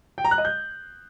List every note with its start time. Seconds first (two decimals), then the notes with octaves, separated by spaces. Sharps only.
0.18 G5
0.25 A#5
0.31 F#6
0.38 D#5
0.45 G6